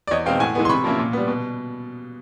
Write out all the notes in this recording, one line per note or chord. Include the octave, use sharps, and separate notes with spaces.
D5
E2 C#5 D#5
B2 G#3 C4 D#4 F5 G5
A2 F#5 G#5
E3 G#3 B3
C6
C3 B5 C#6
F3 A#3 C#4 E4
A#2
G3 B3
B2